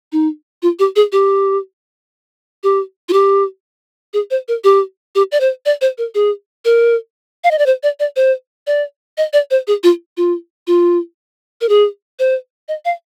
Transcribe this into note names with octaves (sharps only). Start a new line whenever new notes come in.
D#4
F4
G4
G#4
G4
G4
F4
G4
G#4
C5
A#4
G4
G4
D5
C5
D5
C5
A#4
G#4
A#4
F5
D#5
D5
C5
D5
D5
C5
D5
D#5
D5
C5
G#4
F4
F4
F4
A#4
G#4
C5
D#5
F5